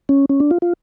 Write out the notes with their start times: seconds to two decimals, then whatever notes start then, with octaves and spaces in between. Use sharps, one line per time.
0.09 C#4
0.30 C#4
0.40 D4
0.51 F4
0.62 F4